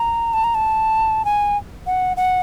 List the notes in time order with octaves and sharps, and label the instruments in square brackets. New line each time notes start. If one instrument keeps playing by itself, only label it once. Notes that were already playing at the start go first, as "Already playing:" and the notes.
Already playing: [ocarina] A#5
A5
A#5
A5
G#5
F#5
F#5